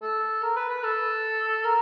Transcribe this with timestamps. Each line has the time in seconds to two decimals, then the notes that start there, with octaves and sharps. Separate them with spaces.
0.02 A4
0.43 A#4
0.56 B4
0.69 B4
0.84 A4
1.65 A#4